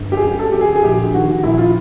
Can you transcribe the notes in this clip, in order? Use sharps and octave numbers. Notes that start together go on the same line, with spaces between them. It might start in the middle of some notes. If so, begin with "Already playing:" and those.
Already playing: G1
G4
G#4
F#2
A4
D3 G4
G#4
G#4
A#1 G4
D#3 F#4
A#1 E4
F4